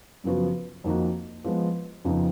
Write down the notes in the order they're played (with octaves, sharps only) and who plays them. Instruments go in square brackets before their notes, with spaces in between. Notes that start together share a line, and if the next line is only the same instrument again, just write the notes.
[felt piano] F#2 C#3 F3 B3 F#4
F2 D#3 A#3 D#4 F#4
F3 G#3 B3
F2 C#3 F3 B3 D#4